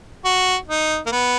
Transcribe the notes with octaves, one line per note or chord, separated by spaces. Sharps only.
F#4
D#4
A#3
B3